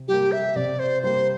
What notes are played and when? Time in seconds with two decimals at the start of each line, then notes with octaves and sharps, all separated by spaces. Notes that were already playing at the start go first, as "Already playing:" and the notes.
Already playing: C3
0.08 G3 A#3 G4
0.32 E5
0.56 C3 D5
0.79 C5
1.03 G3 A#3 C5